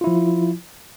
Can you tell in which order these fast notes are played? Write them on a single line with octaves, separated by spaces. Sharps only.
F4 E4 F3